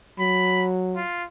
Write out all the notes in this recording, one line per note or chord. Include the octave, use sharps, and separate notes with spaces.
F#3 B5
F4